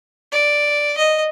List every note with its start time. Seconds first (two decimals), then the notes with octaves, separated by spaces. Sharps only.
0.32 D5
0.98 D#5